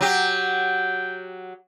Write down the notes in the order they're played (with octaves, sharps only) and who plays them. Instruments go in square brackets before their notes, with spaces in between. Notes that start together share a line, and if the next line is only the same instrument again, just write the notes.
[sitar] F#3 G4 [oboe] G5